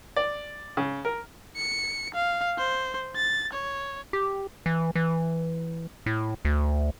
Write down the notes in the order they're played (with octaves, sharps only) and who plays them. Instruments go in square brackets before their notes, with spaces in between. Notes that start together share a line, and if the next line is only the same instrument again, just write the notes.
[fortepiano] D5
C#3
A#4
[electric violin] C#7
F5
C5
A6
C#5
[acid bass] G4
E3
E3
A2
D2